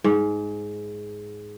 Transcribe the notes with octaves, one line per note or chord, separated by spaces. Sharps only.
G#2